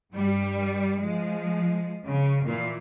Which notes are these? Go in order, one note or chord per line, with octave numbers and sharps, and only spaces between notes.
G2 G3
F3 G#3
C#3
A#2 E3